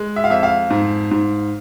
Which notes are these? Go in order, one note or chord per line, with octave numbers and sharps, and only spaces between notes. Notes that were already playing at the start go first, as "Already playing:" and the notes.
Already playing: G#3
E5
F5
F2 E5
F5
G#2
G#2